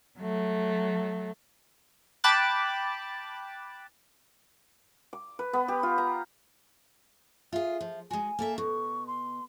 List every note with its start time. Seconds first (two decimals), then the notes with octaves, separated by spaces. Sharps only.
0.19 F#3 A3
2.24 G5 A5 B5 D6 F#6 A6
5.13 D6
5.39 B4
5.53 B3
5.68 G4
5.83 F4
5.98 A#5
7.53 F4 G#4 E5
7.81 F3
8.11 G#3 F#4 G#5
8.39 A#3 A4 E5
8.58 B2 C#6
9.07 C6